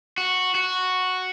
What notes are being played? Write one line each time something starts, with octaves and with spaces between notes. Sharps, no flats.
F#4
F#4